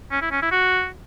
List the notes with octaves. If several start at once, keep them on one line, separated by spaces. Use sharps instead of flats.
C#4
E4
C#4
E4
F#4